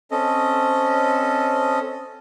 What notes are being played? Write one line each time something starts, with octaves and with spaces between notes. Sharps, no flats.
C4 C#4 A4 D#5